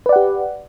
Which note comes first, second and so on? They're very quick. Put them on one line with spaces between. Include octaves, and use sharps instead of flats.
B4 D5 F#5 G4